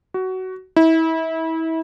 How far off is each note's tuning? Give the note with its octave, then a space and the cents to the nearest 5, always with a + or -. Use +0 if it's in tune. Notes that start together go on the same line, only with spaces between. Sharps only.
F#4 +15
E4 -30